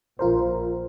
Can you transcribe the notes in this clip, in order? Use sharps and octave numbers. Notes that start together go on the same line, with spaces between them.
A#1 F4 A#4 C5